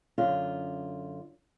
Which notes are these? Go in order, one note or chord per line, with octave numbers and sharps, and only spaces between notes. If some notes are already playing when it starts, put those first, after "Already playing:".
F#2 D3 F4